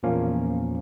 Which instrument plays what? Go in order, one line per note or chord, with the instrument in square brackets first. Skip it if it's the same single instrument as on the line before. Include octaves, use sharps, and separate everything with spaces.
[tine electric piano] E2 A#2 F3 A#3 C#4